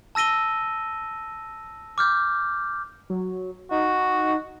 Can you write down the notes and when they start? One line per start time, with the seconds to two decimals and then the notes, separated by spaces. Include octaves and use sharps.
0.15 A5 E6 A#6 D#7 G7
1.98 D6 F6 G6
3.10 F#3
3.71 D#4 F#4